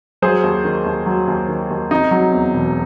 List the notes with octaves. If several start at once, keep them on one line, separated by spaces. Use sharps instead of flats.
F#3 G#4 C5
D#2
D#3
D#2
F#3
D#2
D#3
D#2
C3 D#4
F#3
E2
E1